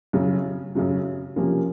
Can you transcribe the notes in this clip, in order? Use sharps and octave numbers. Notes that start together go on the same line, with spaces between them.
F#2 C#3 F#3
F#2 C#3 F#3
C3 F3 A#3 C#4